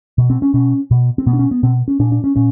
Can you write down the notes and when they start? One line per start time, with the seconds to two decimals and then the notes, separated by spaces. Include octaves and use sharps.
0.18 B2
0.30 C4
0.42 C#4
0.54 B2 C#4
0.91 B2
1.18 C4
1.26 B2 B3
1.33 D4
1.39 C#4
1.51 B3
1.63 B2 C4
1.88 C#4
1.99 A#2 D4
2.12 D4
2.24 C#4
2.36 A#2 C#4